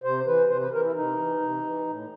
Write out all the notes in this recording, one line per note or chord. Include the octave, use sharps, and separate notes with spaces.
C3 C5
E3 B4
C3 C5
B4
E3 A#4
E4
C3 D#4
E3
C3
E3
A2